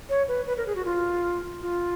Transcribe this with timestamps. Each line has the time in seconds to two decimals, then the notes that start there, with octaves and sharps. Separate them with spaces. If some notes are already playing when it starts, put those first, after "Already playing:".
0.10 C#5
0.28 B4
0.47 B4
0.57 A#4
0.67 G#4
0.76 F#4
0.85 F4
1.61 F4